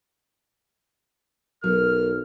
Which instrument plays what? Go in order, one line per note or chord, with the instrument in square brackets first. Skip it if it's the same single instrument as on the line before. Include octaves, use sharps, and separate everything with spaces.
[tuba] B1 [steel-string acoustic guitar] F#3 B3 [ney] A#4 [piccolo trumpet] F6